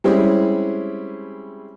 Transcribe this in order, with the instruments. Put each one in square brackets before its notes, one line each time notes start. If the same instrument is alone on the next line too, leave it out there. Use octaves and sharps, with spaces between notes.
[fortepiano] G3 G#3 C4 C#4 E4 G#4